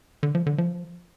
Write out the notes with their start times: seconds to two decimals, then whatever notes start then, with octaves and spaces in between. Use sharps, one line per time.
0.23 D3
0.35 F3
0.46 D3
0.58 F3